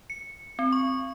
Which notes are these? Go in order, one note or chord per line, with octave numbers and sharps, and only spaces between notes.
C#7
C4
C#6